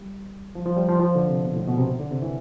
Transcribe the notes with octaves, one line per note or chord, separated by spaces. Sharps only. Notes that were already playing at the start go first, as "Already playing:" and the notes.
Already playing: G3
F3
F3
G3
F3
F3
D3
C3
B2
A2
B2
C3
D3
C3
E3